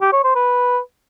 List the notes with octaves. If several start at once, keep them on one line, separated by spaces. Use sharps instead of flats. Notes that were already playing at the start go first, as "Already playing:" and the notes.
G4
C#5
C5
B4